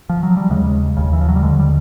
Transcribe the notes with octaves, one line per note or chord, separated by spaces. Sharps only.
F3
F#3
G3
D#2 C#3 G#3
D#2 C#3
E3
F3
F#3
G3
D#2 D3 G#3
G3